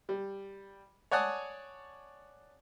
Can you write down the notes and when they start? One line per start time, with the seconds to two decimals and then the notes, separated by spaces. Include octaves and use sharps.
0.09 G3
1.11 C#5 D5 F#5 G#5 A5 D#6